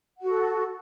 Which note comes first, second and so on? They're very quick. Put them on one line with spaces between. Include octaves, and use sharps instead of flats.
F#5 F#4 A4